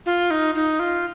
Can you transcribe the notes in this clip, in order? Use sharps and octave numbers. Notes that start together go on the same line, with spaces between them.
F4
D#4
D#4
F4